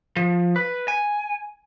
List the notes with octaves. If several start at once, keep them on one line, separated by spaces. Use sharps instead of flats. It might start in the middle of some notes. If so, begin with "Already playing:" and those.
F3
B4
G#5